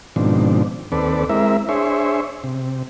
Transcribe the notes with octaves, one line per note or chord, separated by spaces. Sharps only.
G#2 B2 D#3 F3 C4 D4
D#2 C4 A4 B4 D5
G#3 C4 E4 A#4 E5
D4 G#4 C5 C#5 E5
C3